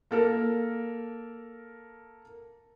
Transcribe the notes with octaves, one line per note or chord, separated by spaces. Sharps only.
A#3 A4 A#4